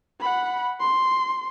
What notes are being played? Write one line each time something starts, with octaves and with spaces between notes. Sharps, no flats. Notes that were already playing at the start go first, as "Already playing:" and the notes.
F#5 B5
C6